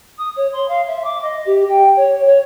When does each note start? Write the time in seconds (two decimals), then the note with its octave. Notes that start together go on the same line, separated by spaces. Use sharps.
0.17 D#6
0.36 C#5
0.52 C6
0.68 F5
0.87 E5
1.04 D6
1.22 D#5
1.45 G4
1.69 G5
1.96 C#5
2.25 C#5